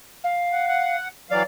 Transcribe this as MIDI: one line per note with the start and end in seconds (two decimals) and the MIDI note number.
0.23 0.96 77
0.52 0.66 78
0.67 1.08 78
1.30 1.43 52
1.30 1.43 54
1.30 1.43 74
1.30 1.43 77